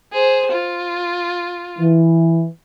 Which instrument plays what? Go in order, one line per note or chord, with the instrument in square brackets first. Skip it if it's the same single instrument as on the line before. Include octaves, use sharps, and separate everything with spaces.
[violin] G#4 C5
F4
[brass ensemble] E3